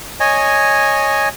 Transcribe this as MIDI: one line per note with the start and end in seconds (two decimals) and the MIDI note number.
0.20 1.29 73
0.20 1.29 75
0.20 1.29 80